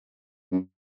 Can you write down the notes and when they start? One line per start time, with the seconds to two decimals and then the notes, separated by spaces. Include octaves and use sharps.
0.52 F#2